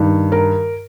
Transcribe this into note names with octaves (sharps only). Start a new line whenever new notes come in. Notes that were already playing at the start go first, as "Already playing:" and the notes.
Already playing: G2 D#3
A#4